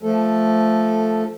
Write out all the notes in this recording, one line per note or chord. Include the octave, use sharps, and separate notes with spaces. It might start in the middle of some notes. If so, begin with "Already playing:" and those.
F3 A3 A4